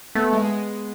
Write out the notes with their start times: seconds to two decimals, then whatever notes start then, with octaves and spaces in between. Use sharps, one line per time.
0.15 A3 B3
0.33 G#3
0.44 G#3